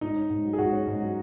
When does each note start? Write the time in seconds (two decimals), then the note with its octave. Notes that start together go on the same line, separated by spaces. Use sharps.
0.01 G#2 D#4
0.16 C#4
0.30 G#2
0.44 F#3
0.53 G#4
0.58 G#2 F#4
0.73 C#4
0.87 G#2
1.01 F#3